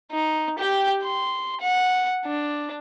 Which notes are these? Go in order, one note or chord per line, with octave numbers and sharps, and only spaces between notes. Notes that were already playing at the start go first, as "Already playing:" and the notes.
D#4
G4 G5
C6
F#5
D4